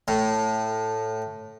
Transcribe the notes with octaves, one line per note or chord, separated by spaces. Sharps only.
A2